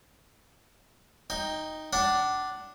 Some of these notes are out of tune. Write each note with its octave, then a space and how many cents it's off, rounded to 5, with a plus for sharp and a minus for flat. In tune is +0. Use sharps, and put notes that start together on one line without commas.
D#4 +0 G5 +10
D4 +0 F#5 +35